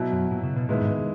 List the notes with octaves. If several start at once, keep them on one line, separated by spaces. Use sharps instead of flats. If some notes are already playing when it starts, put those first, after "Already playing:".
Already playing: B2 F#3 B3 E4
F#2
A#2
C#3
B2
A#2 D#3 G#3 B3 E4
G#2